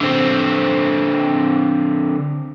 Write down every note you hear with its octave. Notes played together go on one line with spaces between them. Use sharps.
D3 C4